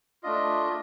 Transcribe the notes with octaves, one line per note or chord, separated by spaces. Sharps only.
A3 D4 F4 D#5